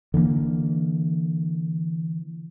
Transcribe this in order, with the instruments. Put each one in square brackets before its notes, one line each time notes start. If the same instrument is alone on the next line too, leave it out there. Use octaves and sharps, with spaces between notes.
[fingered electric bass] D3 E3 G#3 A#3